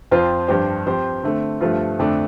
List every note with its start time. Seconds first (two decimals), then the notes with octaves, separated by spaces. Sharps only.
0.11 F2 F3 C4 F4 C5
0.48 G2 F3 D4 G4 C5
0.87 F3 C4 G4 C5
1.24 D3 A3 C4
1.61 G2 F3 A3 F4
1.99 F2 D3 A3 D4